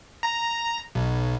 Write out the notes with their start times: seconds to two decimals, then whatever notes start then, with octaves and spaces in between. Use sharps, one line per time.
0.23 A#5
0.95 B1